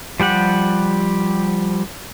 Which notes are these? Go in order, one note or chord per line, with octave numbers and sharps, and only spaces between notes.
F3 G3 G4 F#5